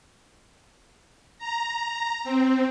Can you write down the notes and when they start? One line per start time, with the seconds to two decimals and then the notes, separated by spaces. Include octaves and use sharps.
1.38 A#5
2.24 C4